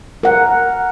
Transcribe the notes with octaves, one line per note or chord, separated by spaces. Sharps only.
A#4 F#5